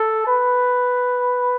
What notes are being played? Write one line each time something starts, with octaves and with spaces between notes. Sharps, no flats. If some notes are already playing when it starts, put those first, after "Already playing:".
Already playing: A4
B4